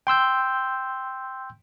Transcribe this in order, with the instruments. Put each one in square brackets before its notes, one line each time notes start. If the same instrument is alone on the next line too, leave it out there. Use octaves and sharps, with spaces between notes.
[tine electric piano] G5 C6 E6 G6